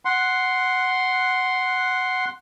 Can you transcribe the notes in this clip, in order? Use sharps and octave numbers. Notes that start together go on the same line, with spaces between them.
F#5 C6